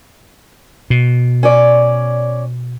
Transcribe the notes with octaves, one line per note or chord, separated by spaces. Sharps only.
B2
C#4 C#5 D5